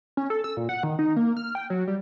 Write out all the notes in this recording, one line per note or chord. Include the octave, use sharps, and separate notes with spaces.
C#4
A4
E6
A#2
F#5
D#3
D#4
A#3
F6
G5
F#3
G3